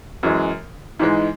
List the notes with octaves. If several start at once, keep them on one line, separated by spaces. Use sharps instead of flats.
F#2 E3 G#3
G#2 E3 G#3